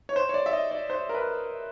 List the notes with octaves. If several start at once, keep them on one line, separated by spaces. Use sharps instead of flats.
C#5
C5
C#5
D5
E5
D#5
D5
C5
A#4
B4